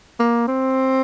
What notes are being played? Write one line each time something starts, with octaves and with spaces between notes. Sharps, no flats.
A#3
C4